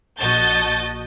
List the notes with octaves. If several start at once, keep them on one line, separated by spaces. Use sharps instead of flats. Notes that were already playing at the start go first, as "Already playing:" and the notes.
A#1 F#4 D#5 A5 G6 A6